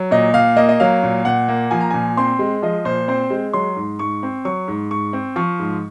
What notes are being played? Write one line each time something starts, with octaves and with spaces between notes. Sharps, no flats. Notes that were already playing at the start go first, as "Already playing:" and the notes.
Already playing: F#3
A#2 D#5
A#2 F5
A#3 D#5
D#5
F#3 F5
A#2
A#2 F#5
A#3
F3 G#5
A#5
A#2 G#5
C4 C6
G#3
F3 D#5
A#2 C5
C4 C5
G#3
F#3 C6
G#2
G#2 C#6
C4
F#3 C#6
G#2
G#2 C#6
C4
F3 C#6
G#2